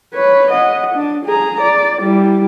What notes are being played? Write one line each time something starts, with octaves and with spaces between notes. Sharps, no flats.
B4 C#5
D#5 F#5
D4
G#4 A#5
D5
G3 E4